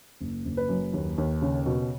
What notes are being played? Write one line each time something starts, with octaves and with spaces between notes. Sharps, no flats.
F#1
F#1
B4
F#2
D#2
D#2
C#3
B2